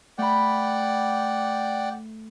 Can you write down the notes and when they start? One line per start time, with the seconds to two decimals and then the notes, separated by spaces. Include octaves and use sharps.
0.18 A3 D5 F#5 G5 B5